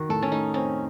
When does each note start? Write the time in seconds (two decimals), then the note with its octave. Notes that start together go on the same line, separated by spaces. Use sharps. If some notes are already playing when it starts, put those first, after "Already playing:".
Already playing: D#3 F#4
0.09 A2 A4
0.22 C#4
0.31 A3 D#4
0.54 C4 C#4